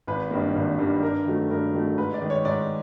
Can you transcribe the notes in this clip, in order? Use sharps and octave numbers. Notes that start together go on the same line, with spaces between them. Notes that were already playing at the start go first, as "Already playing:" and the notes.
G#1 B4
G2 D#3 G3 A#3
G#1
G2 D#3 G3 A#3
G2 A#4
D#3 F#3 A3
G2 A#4
D#3 F#3 A3
G#2 B4
D5
D#3 G#3
C#5
G#2 D5